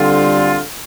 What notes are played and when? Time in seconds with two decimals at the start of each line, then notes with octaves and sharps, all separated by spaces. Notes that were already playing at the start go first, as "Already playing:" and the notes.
Already playing: D3 G3 C4 F4